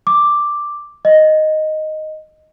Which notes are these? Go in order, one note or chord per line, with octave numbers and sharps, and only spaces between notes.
D6
D#5